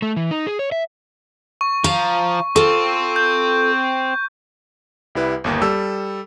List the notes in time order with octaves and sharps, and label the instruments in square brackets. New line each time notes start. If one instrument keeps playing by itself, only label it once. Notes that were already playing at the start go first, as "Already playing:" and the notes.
[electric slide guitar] A3
E3
D#4
G#4
C#5
E5
[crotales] C#6
[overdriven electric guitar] F3 [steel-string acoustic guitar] F5 A#5
[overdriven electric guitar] C4 [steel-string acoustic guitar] F4 A4 [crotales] C#6
[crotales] G6
[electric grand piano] C2 G3 E4 B4
G1 D#2 A#3
G3 A4 E6